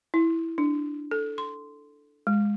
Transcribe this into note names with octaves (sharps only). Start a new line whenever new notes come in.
E4
D4
A4
C6
G#3